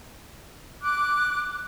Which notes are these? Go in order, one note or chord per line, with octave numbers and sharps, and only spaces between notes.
D6 F#6